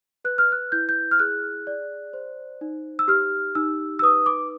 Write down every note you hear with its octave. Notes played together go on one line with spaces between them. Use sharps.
B4 F#6
F6
F#6
E4 G6
G6
F6
G#4 F#6
D5
C5
D#4
E6
G4 F6
D#4 E6
E6
B4 D#6
D6